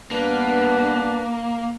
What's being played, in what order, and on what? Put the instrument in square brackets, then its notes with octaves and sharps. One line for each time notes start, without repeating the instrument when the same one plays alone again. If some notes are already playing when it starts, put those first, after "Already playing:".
[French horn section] G2 B3 [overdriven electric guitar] A#3 [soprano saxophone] D4 [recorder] B4